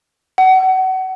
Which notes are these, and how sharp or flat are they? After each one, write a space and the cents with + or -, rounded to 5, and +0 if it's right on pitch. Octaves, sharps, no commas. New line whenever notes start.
F#5 +30